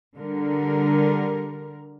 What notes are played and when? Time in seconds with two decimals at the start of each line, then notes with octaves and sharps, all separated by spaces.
0.16 D3 G3 A#4